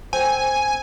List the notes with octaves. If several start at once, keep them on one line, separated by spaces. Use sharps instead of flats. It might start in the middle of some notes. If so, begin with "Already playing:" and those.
C4 A4 G#5